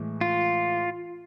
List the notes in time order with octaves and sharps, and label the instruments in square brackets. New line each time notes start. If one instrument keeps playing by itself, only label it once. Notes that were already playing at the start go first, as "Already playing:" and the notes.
Already playing: [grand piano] A2 E3 G#3
[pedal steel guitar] F4